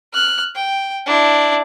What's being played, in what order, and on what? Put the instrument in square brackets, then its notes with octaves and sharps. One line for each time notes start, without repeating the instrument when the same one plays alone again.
[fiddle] F6 F#6
G5
D4 E4